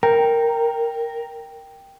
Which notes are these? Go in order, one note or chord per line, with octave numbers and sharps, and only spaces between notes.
A#4 G5